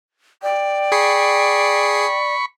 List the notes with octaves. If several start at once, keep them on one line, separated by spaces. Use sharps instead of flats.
D5 G5
G#4 B5 C#6 C7